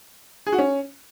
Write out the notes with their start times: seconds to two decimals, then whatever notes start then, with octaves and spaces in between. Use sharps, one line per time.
0.46 G#4
0.52 F#4
0.58 C#4